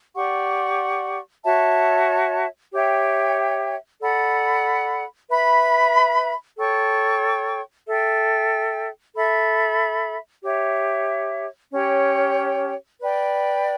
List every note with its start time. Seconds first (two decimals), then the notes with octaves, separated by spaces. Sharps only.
0.15 G4 D5 F#5 C#6
1.44 F#4 C#5 E5 A5
2.73 G4 C#5 E5 G5
4.01 A4 D5 F#5 B5
5.29 B4 E5 B5
6.57 A4 C#5 G5 C#6
7.86 A4 E5 G5
9.15 A4 E5 B5
10.43 G4 C#5 E5
11.71 C#4 G4 C#5 G5
13.00 B4 D5 G5